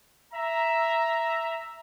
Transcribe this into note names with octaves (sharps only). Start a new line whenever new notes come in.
E5 A#5